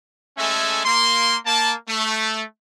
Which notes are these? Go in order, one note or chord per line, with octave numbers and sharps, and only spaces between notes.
G#3 A3 C#4 A4 E5 G#5
A#3 C6
A#3 A5
A3